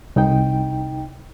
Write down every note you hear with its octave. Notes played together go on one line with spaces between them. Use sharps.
C2 D#4 G5